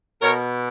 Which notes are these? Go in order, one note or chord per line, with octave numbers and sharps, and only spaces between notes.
B2 A#4 C#5